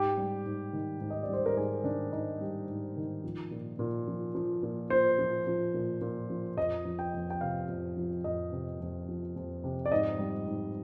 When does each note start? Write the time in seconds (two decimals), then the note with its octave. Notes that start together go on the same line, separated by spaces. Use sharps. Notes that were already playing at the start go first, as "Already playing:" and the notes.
Already playing: G#2 G4
0.17 G3
0.46 G#2
0.73 D#3
1.00 G#2
1.10 D#5
1.23 D5
1.28 G3 C5
1.46 A#4
1.56 G#2 G#4
1.84 D#3 D4
2.12 G#2 D#4
2.41 G3
2.69 G#2
2.96 D#3
3.24 F3
3.51 A#2
3.79 A#2
4.07 F3
4.35 F3
4.63 A#2
4.90 A#2 C5
5.19 F3
5.47 F3
5.74 A#2
6.01 A#2
6.30 F3
6.57 F2 D#5
6.85 F3
6.99 G5
7.14 F2
7.30 G5
7.41 C3 F5
7.68 F2
7.97 F3
8.24 F2 D#5
8.52 C3
8.80 F2
9.09 F3
9.36 F2
9.64 C3
9.86 D5
9.92 G#2 D#5
10.19 G3
10.47 G#2